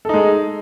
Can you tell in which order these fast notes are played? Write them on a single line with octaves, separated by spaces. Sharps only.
A4 D#4 G#3